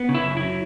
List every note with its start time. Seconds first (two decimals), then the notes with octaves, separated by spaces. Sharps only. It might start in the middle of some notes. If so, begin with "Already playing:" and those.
Already playing: B3
0.09 C#3
0.15 E4
0.25 F#2
0.37 E4
0.42 F#3